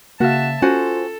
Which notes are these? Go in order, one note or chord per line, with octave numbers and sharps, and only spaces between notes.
C#3 A#3 F#4 E5 F5 A5
C#4 F4 F#4 A4 C5 G#5